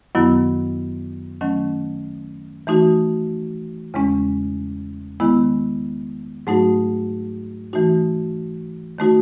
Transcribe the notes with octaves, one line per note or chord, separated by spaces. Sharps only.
F#2 D#3 F#3 B3 E4
D#3 F#3 A3 C#4
E3 A3 D#4 F#4
E2 C#3 G#3 C#4
D#3 G#3 B3 E4
G#2 F#3 A3 D#4 F#4
E3 A3 D#4 F#4
D#3 A3 D#4 F#4